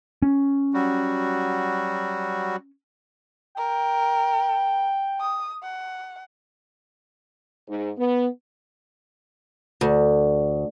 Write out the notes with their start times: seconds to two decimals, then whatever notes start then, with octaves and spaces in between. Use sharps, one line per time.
0.22 C#4
0.74 F#3 G3 F#4
3.57 A#4 G5
5.20 D#6
5.63 F#5
7.68 G#2
7.97 B3
9.81 D2